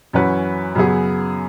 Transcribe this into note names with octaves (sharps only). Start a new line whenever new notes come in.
F#2 E3 C#4 F#4 B4
F#2 C#3 F#3 B3 G#4